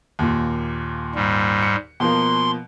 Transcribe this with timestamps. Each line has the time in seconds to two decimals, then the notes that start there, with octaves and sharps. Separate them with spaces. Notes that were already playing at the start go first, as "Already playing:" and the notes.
0.19 D#2 A#2
1.15 G#2 G3
1.62 C#7
2.00 B2 F3 A#3 C6